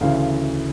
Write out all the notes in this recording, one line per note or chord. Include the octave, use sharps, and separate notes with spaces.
D2 C#3 E3 F5